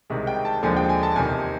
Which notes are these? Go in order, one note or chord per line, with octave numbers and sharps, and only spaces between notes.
C2 C3 D#3 G#3
G5
A5
D#2 D3 F3 G#3 G#5
G5
G#5
A5
E2 C3 D#3 G#5